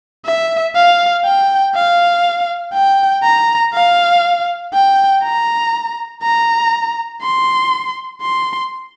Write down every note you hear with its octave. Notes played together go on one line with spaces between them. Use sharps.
E5
F5
G5
F5
G5
A#5
F5
G5
A#5
A#5
C6
C6